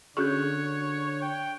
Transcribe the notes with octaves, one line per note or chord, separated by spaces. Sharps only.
D3 C#4 F#4 G#4 C#5 C#6 F#6 G6
G5